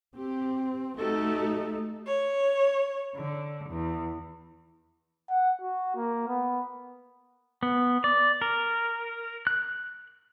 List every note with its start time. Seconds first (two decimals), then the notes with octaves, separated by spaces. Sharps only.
0.17 C4 G4
0.98 A3 D#4 F#4 G4 A4
2.07 C#5
3.16 D3
3.69 E2
5.30 F#5
5.61 F#4
5.96 A#3
6.28 B3
7.63 B3
8.04 D5
8.42 A#4
9.47 F#6